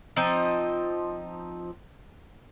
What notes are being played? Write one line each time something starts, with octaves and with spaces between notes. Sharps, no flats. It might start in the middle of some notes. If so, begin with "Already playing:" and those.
F3 C4 D#4 D#5